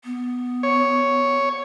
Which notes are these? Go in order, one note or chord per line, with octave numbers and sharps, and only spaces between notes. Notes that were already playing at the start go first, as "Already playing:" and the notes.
B3
C#5